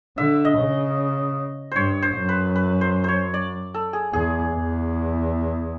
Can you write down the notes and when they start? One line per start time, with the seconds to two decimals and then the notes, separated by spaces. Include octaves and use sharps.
0.18 D3 E5
0.45 D#5
0.58 C#3
1.72 G2 C5 C#5
2.02 C5
2.16 F#2
2.29 B4
2.56 B4
2.81 C5
3.04 C5 C#5
3.34 D5
3.74 A4
3.93 G#4
4.13 E2 G#4
4.53 E2